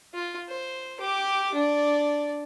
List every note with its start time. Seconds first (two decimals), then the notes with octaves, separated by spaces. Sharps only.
0.15 F4
0.49 C5
1.00 G4 D6
1.54 D4 D5